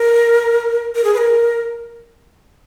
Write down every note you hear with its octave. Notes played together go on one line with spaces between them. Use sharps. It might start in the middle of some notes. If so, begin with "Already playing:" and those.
Already playing: A#4
A#4
G#4
B4
A#4